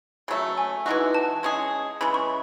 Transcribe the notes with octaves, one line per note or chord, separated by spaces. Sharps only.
C#3 F#3 A3
G#5
E3 G#3 D#4 F#4
A5
G#3 C#4 G#4
C#3 E3 G#3 B5
C#6